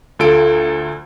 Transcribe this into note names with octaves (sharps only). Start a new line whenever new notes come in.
D2 F4 A4 D7